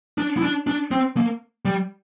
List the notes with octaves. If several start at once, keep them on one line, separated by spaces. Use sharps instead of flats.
D4
E4
D4
D4
C4
A#3
G3